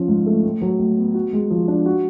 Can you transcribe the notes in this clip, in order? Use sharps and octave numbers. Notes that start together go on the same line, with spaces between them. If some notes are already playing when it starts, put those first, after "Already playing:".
Already playing: F3 C#4
G#2
A3
A2
F#3
A2
B3
F#4
G#3
F3
D4
F#4